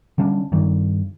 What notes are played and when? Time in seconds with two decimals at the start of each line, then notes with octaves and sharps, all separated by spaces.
0.18 D3 G3 C#4 D4
0.52 G2 D#3